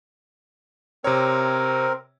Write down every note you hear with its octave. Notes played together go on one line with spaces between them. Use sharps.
C3 C4 A#4 C#5